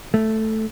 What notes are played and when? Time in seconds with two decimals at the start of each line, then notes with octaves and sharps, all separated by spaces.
0.14 A3